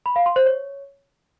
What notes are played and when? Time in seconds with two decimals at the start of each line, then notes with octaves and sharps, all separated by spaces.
0.06 B5
0.16 F5
0.26 C6
0.36 C5
0.46 C#5